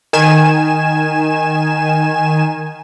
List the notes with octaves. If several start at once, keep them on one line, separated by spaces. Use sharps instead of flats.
D#3 G#5 E7